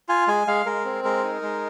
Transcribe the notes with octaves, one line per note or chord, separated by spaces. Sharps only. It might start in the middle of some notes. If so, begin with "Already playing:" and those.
F4 G#5
G#3 G#5
G#3 F5
G#3 A#4
C4
G#3 A#4
D#4
G#3